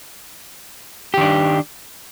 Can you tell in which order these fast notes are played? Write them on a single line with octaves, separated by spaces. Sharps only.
G4 D#3 D4